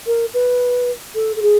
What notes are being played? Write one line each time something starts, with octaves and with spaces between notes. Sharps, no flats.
A#4
B4
A4
A4
G#4